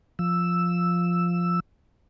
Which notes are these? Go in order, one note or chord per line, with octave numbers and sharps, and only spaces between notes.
F3 E6